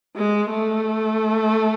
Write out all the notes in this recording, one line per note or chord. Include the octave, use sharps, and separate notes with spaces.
G#3
A3